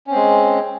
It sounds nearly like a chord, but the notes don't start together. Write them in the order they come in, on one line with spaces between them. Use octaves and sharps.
C#4 C4 G#3